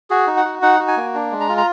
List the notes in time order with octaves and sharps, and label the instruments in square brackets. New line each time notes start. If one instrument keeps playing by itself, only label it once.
[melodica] F#4 G#4
D#4
F#5
F#4
D#4 F#5
F#4
G#5
A#3
D4
G#3
A#5
F4
A#5